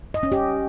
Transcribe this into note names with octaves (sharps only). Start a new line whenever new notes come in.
D#5
C#4
G4